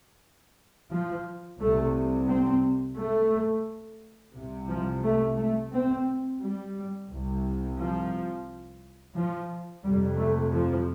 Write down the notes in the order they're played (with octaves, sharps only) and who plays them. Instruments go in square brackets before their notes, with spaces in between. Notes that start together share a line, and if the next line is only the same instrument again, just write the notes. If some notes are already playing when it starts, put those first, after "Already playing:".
[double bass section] F3
C2 C3 A3
C4
A3
C2 C3
F3
A3
A3
C4
G3
C2 C3
F3
F3
F2 C3 G3
A3
F3